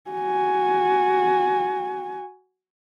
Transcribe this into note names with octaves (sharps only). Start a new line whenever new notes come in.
F#4 G#5